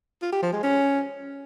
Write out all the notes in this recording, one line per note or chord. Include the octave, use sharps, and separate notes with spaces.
F4
G4
F3
G#3
C#4